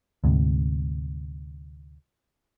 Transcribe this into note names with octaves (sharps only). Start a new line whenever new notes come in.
D2 G#2 C3